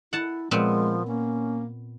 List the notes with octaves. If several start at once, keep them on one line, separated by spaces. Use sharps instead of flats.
E4 F#5 A5
A#2 F3 G#3 B3 C4
A#3 C#4